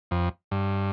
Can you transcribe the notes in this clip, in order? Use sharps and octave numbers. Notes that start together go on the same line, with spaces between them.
F2
G2